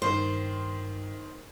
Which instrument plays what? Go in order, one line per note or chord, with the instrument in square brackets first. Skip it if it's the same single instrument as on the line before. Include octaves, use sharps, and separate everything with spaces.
[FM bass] G2 [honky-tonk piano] D#3 C6 [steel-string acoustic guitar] C5